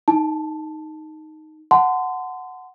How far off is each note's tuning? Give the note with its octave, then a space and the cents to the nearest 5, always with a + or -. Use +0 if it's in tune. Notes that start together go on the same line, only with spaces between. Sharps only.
D#4 +0 A5 +0
F#5 +0 A5 +0 C6 -25